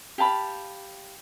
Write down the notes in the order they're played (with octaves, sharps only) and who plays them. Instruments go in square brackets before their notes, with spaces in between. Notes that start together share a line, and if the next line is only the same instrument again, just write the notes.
[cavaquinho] G4 F5 A5 B5